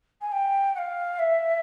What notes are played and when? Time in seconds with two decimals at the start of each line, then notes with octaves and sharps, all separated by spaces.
0.21 G#5
0.32 G5
0.74 F#5
0.78 F5
1.18 E5